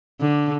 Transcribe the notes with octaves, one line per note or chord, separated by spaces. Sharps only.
D3